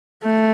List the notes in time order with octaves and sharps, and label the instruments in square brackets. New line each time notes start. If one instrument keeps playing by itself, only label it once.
[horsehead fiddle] A3